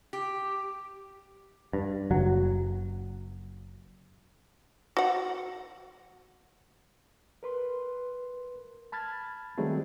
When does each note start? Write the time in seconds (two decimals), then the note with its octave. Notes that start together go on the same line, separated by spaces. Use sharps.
0.13 G4
1.73 G2
2.11 F#1 F#3
4.97 F#4 F#5
7.43 A#4 B4 C6
8.92 A5 B5 F6 G#6 A6
9.58 D#3 F#3 G3 A3 C4 G#4